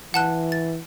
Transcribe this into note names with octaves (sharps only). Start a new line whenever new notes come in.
E3 F#5 A5 F#6
A6